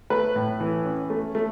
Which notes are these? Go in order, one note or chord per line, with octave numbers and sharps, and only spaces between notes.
A3 B4
A2
E3
C#4
A3
A3